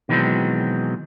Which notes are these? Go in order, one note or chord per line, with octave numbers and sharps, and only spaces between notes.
B2 D#3 E3 F#3 G#3 C4